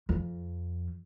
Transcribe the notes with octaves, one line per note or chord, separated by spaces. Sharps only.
F2